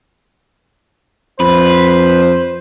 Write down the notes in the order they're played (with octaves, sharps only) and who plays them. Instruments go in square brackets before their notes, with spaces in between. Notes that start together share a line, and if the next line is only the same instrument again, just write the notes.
[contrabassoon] F2 [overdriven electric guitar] B4 [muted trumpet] C5